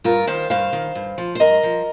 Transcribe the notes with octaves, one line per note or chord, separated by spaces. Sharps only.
G2 F4 A#4
D#3 C5 F5
G2 C5 F5
D#3
G2
F3
C5
G2 A#4 D#5
F3